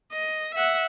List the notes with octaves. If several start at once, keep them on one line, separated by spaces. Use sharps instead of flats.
D#5
E5 F#5